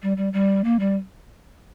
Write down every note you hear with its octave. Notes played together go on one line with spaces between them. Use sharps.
G3
G3
G3
A#3
G3